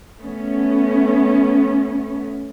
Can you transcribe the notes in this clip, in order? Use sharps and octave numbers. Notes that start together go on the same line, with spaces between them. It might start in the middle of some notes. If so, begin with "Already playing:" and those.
A3 B3 C#4